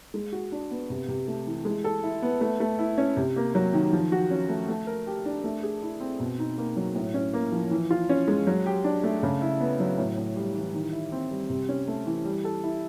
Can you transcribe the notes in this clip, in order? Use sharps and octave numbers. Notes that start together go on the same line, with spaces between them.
G#3
F#4
D4
B3
C3
C3
A3
E3
G#3
A4
E4
B3
A3
A3
E4
C#4
C3
A#3
F#3
D#3
F3
F#4
C#4
A3
A3
A#4
G4
D4
A3
G#4
E4
C4
B2
D#4
A#3
F#3
A2
C#4
A#3
F3
E3
F4
C#4
G#3
F#3
G4
D4
A3
C#3
E4
B3
F#3
A2
A2
G3
E3
D#3
E4
C4
G3
C3
C#4
A3
E3
G3
A4
E4